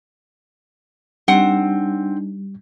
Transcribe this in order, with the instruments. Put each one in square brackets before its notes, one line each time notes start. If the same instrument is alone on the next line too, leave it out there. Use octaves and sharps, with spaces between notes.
[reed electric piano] G3 [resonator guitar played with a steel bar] C4 F#5 [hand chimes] D4 D#4